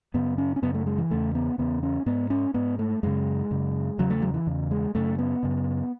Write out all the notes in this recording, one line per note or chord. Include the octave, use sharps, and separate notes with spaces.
F#2 C#3 B3
C#4
C#4
F#2 C#3 B3
A3
G#3
E3
E2 C#3 A3
B3
E2 C#3 B3
C#4
G#2 B3
C#4
G#2 B3
A3
F#2 C#3 G#3
F#2 C#3
E2 C#3 F#3
A3
F#3
E3
E2 C#3
G#3
F#2 C#3 A3
B3
F#2 C#3